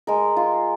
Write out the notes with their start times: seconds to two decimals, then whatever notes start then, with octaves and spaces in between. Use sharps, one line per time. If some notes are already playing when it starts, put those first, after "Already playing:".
0.07 G#3 A#4
0.37 F4